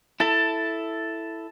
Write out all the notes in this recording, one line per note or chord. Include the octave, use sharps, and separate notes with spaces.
E4 A4 A5